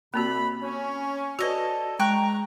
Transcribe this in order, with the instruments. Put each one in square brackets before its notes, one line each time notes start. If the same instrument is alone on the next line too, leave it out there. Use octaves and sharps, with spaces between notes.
[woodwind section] C2 C3 B5 [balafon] A#3 C4 F#4
[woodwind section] C#4
[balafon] F#4 B4 [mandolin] A4 D#5 [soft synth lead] D5
[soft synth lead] G#3 [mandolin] G5 C#6 F#6 [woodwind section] A#5